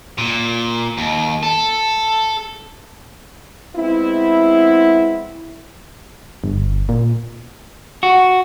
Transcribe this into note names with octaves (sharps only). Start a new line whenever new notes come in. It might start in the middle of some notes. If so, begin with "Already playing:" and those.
A#2
D#2
A4
G#3 B3 C4 E4
G1
A#2
F#4